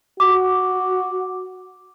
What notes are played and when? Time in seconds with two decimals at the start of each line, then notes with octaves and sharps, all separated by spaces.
0.20 F#4 D6